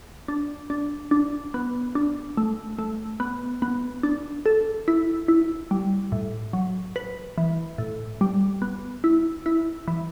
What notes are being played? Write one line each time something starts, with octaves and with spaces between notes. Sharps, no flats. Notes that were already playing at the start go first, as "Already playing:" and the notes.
D4
D4
D4
B3
D4
A3
A3
B3
B3
D4
A4
E4
E4
G3
A2
F#3
B4
E3
A2
G3
B3
E4
E4
E3